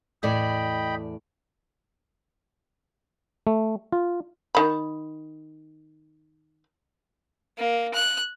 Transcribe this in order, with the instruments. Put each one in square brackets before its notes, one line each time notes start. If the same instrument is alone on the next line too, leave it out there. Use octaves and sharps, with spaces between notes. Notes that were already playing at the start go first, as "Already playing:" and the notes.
[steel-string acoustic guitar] E2 A2 D5 [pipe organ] D#5 G5 B5
[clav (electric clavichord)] A3
F4
[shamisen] D#3 B5
[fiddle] A#3
F#6